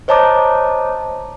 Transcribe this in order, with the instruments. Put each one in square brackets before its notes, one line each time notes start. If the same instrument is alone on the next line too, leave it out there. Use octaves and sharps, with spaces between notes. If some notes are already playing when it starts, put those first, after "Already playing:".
[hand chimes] C5 C#5 D#5 A5 A#5 D6